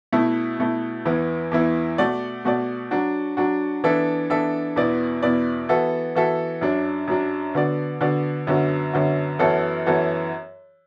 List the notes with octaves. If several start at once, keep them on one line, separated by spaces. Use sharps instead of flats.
B2 A3 E4
B2 A3 E4
E2 E3 B3 E4
E2 E3 B3 E4
B2 A3 F#4 D5
B2 A3 F#4 D5
F#3 D4 F#4
F#3 D4 F#4
E3 B3 D4 A4 E5
E3 B3 D4 A4 E5
E2 B2 B3 E4 D5
E2 B2 B3 E4 D5
E3 B3 F#4 A4 E5
E3 B3 F#4 A4 E5
F#2 F#3 D4
F#2 F#3 D4
D3 B3 F#4 D5
D3 B3 F#4 D5
F#2 D3 B3 F#4
F#2 D3 B3 F#4
F#2 E3 B3 F#4 A4
F#2 E3 B3 F#4 A4